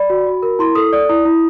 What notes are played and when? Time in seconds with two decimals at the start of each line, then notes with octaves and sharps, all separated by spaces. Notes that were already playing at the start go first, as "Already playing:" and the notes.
Already playing: D5 B5
0.10 F#4
0.27 F#4
0.43 A#4
0.59 E4 C6
0.75 A4 D#6
0.93 D5 D#6
1.09 E4 D#6
1.25 E4